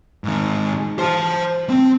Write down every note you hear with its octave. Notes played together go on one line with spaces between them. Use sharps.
G#2 D#3
C5 A5
C4